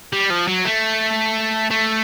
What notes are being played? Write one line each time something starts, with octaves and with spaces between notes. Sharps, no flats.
G3
F3
F#3
A3
A3